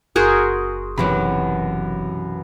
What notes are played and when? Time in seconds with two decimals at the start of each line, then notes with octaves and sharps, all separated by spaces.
0.16 F#1 F#4 G#4 A#4 C6 C#6 G6
0.98 B1 F#2 C3 E3 F#3 B5